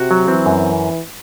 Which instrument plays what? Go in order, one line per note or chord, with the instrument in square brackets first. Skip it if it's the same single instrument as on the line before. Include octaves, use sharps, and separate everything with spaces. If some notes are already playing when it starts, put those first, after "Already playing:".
Already playing: [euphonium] C3 [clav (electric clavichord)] F#4
[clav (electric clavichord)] F#3
[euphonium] E3 [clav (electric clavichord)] C4
[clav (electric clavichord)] F#2